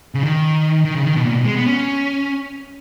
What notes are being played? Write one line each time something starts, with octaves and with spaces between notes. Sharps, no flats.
C#3
D#3
D#3
C#3
D#3
B2
A#2
B2
G#3
B3
C#4